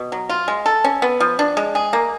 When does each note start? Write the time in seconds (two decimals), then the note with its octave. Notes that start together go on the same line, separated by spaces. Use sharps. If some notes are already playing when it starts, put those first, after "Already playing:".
Already playing: B2
0.12 F#3
0.29 F4
0.48 G#3
0.66 A4
0.84 C#4
1.02 B3
1.20 F3
1.39 D4
1.57 G#3
1.75 G#4
1.93 A#3